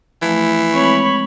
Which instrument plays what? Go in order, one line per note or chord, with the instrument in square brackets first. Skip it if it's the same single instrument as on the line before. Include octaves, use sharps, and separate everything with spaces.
[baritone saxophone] E3 [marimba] F3 A3
[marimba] G#3 C4 [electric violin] C#5 B5